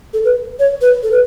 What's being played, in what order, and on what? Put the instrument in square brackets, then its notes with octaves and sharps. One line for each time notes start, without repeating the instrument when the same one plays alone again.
[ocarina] A4
B4
C#5
B4
A4
B4